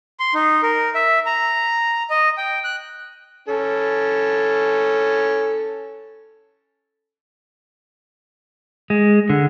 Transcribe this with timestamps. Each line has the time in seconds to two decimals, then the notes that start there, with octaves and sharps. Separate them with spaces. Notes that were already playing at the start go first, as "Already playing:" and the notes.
0.20 C6
0.34 D#4
0.63 A#4
0.95 E5
1.26 A#5
2.10 D#5
2.37 G5
2.64 F#6
3.48 C#4 A4
8.90 G#3
9.30 D3